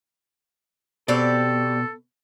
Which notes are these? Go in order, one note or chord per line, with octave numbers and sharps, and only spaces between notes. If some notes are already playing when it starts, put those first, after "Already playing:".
B2 C4 G4 A4 D5